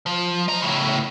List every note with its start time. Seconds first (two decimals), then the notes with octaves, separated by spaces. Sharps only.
0.06 F3
0.48 D#5 A#5
0.62 A2 C#3